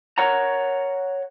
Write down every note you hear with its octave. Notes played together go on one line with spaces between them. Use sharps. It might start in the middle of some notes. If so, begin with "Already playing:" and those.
A#4 C#5 F#5 A#5